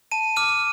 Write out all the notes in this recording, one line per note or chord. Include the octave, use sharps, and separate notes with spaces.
A5 D#7
D6 F6 D#7